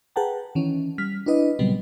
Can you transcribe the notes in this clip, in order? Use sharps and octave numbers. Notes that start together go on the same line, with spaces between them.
G#4 B4 F#5 G5 A5 A#5
D#3 E3 C#4
G3 F6 B6
D4 E4 B4 D#5
A#2 C#3 F#3 G3 B3 C4